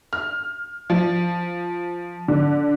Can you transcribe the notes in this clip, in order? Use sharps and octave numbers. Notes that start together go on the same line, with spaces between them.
F6
F3
D3